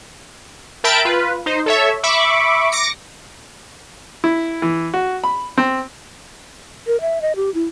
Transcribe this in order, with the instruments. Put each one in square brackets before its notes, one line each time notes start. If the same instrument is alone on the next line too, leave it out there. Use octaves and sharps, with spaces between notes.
[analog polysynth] A#4 E5 G5 A5 B5 D7
F4 B4
D#4 C5
A4 C#5 E5
E5 B5 C#6 D6
D6 A#6 C#7
[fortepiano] E4
E3
F#4
B5
C4
[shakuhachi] A#4
E5
D#5
G4
E4